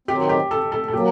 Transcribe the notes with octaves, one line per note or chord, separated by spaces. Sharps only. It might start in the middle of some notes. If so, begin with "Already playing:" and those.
D#3 F#3 C4 G4
G4
A4
A4
A4
F#3 A#3 G4